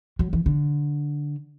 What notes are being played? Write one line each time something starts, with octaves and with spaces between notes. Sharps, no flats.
F#3
E3
D3